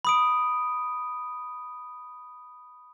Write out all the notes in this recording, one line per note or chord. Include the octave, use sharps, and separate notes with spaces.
B5 D#6 D7